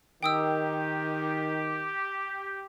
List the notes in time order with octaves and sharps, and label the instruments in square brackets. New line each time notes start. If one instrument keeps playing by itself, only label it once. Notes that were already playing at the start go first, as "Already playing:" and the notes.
[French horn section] D#3 [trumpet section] G4 [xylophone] G5 D#6 E6